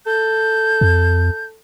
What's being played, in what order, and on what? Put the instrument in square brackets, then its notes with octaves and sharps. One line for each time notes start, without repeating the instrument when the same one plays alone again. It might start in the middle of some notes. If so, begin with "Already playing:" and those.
[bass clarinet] A4 [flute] G6
[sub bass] F2